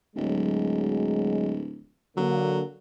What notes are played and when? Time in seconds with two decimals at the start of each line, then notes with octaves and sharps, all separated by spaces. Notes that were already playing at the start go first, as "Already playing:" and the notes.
0.16 D1 F#3 G#3
2.17 D3 F#3 A#3